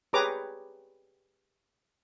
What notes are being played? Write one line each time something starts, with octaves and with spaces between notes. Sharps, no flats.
G4 G#4 B4 C#5 A#5 D6